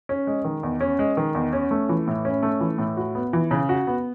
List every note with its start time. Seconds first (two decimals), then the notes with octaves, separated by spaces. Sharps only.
0.09 C#4
0.27 G#3
0.45 D#3
0.63 E2
0.81 C#4
0.99 G#3
1.17 D#3
1.35 E2
1.53 C#4
1.71 A3
1.89 E3
2.07 A2
2.25 C#4
2.43 A3
2.61 E3
2.78 A2
2.97 F#4
3.15 B3
3.33 E3
3.51 C#3
3.69 F#4
3.87 B3